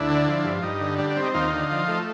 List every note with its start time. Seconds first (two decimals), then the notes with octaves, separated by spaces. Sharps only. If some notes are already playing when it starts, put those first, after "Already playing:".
Already playing: D2 D4 E4
0.10 D3
0.28 F3
0.44 G2
0.62 G2 D#4
0.81 D3
0.98 G3 D4
1.10 D4
1.16 C4
1.23 D#4
1.34 D#2 D#4 F4
1.53 D3
1.71 F3
1.88 A3